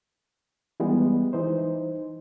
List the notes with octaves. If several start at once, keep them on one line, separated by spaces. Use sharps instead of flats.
E3 G3 G#3 B3
E3 D#4 C5